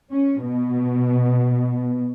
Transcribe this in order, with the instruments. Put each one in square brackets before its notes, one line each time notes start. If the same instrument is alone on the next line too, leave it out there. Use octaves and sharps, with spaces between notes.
[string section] C#4
B2